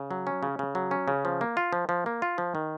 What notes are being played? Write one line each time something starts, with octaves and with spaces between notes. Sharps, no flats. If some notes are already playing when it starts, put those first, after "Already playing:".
Already playing: C#3
F#3
C#4
C#3
C#3
F#3
C#4
C#3
F3
A#3
F4
F3
F3
A#3
F4
F3
D#3